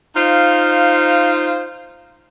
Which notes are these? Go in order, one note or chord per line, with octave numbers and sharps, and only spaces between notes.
D#4 F4 C5 F5